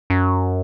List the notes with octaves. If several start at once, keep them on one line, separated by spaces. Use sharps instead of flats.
F#2